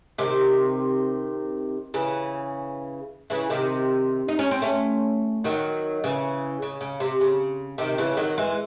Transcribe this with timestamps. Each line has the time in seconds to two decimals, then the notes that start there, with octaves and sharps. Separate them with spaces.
0.18 C3 D#3
1.94 C#3 E3
3.30 C#3 E3
3.50 C3 D#3
4.28 D#4
4.39 C#4
4.51 C4
4.62 A3 C#4
5.44 D#3 F#3
6.04 C#3 E3
6.62 C#3
6.81 C#3
7.00 C3
7.21 C#3
7.78 C3 D#3
7.98 C#3 E3
8.17 D#3 F#3
8.38 E3 G#3